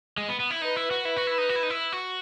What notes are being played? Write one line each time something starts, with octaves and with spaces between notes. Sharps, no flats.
G#3
B3
B3
E4
D#4 B4
E4
F#4
E4 B4
F#4
E4
D#4
F#4
E4
D#4
E4
F#4